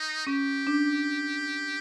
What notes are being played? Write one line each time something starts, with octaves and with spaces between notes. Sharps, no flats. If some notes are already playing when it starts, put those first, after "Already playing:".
Already playing: D#4
C#4 G4
D4